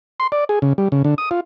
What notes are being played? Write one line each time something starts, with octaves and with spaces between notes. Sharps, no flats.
C6
D5
G#4
C#3
G3
C#3
D3
D#6
F4